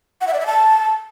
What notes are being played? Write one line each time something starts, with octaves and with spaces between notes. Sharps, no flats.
F#5
E5
D5
E5
A5